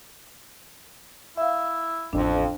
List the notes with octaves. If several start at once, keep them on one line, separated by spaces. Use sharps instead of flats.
E4 E5 F5
A1 F2 D4